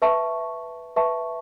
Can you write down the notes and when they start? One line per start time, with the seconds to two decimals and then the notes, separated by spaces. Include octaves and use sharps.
0.02 B4 E5 A5 C#6
0.96 B4 E5 A5 C#6